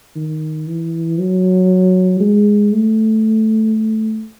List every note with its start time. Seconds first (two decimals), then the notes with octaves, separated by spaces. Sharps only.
0.16 D#3
0.67 E3
1.19 F#3
2.20 G#3
2.72 A3